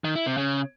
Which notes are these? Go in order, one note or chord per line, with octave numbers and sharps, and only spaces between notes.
D#3
E4
C3
C#3